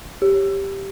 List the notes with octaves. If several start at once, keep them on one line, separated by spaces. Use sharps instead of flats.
G4